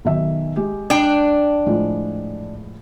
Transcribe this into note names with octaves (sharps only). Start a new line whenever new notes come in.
B1 D#3 E5
G#3 G4
D4 G5
A2 F3 G#3